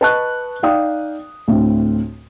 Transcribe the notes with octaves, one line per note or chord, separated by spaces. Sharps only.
B4 D#5 A5 C#6 F#6
D#4 D5 F5 G5 D#6
D2 A2 C4